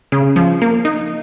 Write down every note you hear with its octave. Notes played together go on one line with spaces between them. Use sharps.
C#3
F3
A#3
D#4